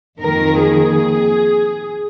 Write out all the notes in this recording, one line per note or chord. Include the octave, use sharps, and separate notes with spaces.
F2 D#3 A#3 A#4
G#4